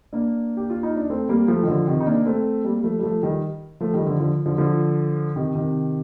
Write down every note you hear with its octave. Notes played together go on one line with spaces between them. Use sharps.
A#3 D4
G4
F4
D#4
D4
A3 C4
G3 A#3
F3 A3
D#3
D3 F3
C3 D#3
D#4
A#3 D4
A3 C4
G3 A#3
G3
F3 A3
G3
F3 A3
D#3 G3
F3 A3
D#3 G3
D3 F3
D3 F3
D3 F3
D3 F3
C3 D#3
C3 D#3